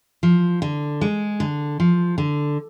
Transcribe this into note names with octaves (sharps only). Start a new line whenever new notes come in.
F3
D3
G#3
D3
F3
D3